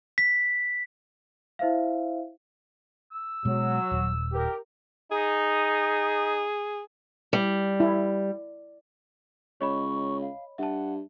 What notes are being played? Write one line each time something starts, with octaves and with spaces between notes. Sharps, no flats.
B6
E4 C5 E5 F5
E6
B2 F#3 G#3
D#1
G4 A#4
D#4 G#4
G3
E4
C#2 C#5 D#5 B5 C#6
F5
G2 E5 F#5 A5